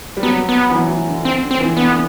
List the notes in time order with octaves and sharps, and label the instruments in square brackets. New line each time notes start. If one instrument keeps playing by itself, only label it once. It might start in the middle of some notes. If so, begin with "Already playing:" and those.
[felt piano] G3
[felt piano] F#3 [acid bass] B3
[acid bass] B3
[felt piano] E3
F#3
E3
D3
[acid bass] C4
[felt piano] D3
[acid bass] C4
[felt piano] E3
[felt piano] D3 [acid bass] B3